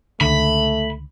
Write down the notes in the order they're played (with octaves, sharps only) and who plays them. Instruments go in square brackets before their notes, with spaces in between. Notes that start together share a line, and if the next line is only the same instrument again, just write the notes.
[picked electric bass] C#2 D3 [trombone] A3 [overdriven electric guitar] B5